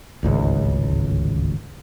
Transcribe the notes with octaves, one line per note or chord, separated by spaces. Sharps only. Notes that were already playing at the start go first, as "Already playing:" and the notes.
D1 G#1 C#2